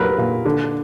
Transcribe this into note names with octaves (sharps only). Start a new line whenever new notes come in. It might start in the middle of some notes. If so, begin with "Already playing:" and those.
Already playing: A#2 F#3 A#4 B4
A#2
D3